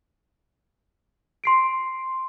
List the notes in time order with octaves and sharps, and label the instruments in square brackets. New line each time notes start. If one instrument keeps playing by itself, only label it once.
[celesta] C6 C7 D7